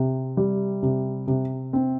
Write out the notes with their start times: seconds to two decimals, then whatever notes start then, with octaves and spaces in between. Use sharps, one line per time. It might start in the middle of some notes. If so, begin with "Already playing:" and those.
Already playing: C3
0.37 G3
0.83 C3
1.27 C3
1.73 C4